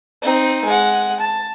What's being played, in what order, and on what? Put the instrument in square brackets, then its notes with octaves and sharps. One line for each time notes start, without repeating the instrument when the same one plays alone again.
[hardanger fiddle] C4 D#4
G#3 F#5
A5